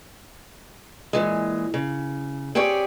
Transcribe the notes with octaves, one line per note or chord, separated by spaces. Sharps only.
A#2 E3 G#3
C#3
C4 G4 G#4 C#5 D5